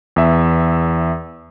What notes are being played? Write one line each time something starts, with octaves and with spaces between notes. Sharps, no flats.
E2 E5